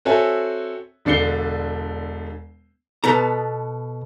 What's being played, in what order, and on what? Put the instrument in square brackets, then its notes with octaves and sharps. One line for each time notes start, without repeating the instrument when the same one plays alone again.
[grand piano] C4 F#4 A4 C#5 E5 G#5
E1 D3 D4 C7 C#7 G7
[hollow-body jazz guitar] B2 B3 A4 A#5